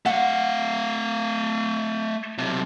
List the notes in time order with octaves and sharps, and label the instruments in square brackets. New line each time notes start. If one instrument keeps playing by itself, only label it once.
[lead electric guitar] A3 F5 [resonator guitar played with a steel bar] F#5
[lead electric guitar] B1 C3